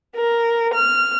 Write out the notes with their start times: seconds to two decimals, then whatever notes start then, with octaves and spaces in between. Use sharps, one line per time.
0.16 A#4
0.74 F6